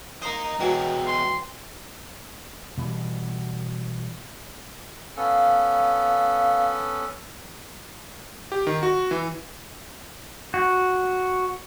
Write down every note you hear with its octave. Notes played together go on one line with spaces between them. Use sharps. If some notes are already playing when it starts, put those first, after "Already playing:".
A#3 C5 D#5 A#5
B2 E3 F#3 G#3 B3 G5
C6
B2 E3 G3
B3 C#4 A4 F5
G4
D#3
F#4
E3
F#4